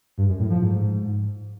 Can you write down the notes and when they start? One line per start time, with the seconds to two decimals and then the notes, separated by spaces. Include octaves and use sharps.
0.18 G2
0.29 F#2
0.40 A2
0.50 F3
0.61 G#2